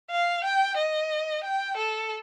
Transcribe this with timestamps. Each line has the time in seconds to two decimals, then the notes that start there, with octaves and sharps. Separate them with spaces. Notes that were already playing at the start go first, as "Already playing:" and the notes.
0.11 F5
0.44 G5
0.77 D#5
1.44 G5
1.77 A4